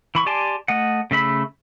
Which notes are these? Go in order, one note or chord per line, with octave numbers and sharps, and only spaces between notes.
E3 B5 C#6
G4 D5 G#5 A5 C6
A3 D#5 F#5
C#3 A3 E5 B5